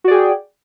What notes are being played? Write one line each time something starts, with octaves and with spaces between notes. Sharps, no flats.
F#4 G#4 D5 G5